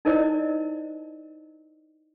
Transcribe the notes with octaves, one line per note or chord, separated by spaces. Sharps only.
D#4 E4 A#4 C5 D5 D#5